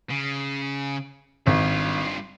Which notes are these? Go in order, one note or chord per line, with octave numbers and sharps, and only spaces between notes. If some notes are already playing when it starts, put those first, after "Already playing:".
C#3
G#1 G2 F4